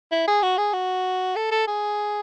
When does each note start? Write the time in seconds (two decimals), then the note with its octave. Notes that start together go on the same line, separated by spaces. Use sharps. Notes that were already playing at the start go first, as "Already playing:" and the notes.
0.12 E4
0.27 G#4
0.42 F#4
0.58 G#4
0.73 F#4
1.36 A4
1.52 A4
1.67 G#4